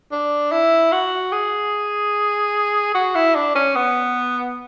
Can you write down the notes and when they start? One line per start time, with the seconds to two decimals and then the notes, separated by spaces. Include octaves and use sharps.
0.12 D4
0.52 E4
0.92 F#4
1.32 G#4
2.94 F#4
3.16 E4
3.35 D4
3.55 C#4
3.76 B3